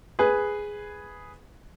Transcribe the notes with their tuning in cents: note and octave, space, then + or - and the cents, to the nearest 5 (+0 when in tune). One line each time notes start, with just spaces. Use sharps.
G#4 +0 B4 +0